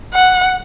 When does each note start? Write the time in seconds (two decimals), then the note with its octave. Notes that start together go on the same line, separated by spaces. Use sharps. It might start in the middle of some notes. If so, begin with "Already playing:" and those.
0.14 F#5